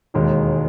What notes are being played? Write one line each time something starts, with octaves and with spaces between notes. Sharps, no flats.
E1 D#2 D#3 G#3